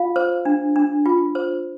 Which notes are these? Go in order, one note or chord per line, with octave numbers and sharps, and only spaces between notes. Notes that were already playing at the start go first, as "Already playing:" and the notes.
Already playing: F4 F5
C5
D4
D4
F4
C5